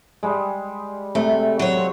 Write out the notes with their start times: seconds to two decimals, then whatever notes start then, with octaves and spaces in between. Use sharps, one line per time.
0.23 G3 G#3
1.15 C3 A3
1.59 F#3 C#5
1.77 C4 F5